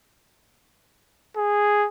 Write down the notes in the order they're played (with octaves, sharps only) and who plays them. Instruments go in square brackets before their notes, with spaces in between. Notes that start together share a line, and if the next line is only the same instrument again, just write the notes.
[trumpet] G#4